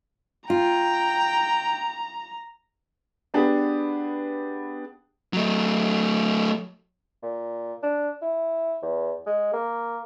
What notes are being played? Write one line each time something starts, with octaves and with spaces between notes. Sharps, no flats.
F4 G5 A#5
B3 D4 G4 G#4
F#3 A3
A#2
D4
E4
E2
G#3
A#3